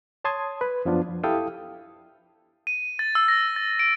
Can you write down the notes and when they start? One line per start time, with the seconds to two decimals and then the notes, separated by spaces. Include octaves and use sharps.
0.24 C#5 A5 C6 D#6 G#6
0.61 B4
0.85 F#2 F3 B3 D4 F4
1.09 F3
1.23 E4 G4 A4 F5 G5 D#6
2.67 D#7
2.99 A6
3.15 E6
3.28 A#6
3.56 A6
3.79 D7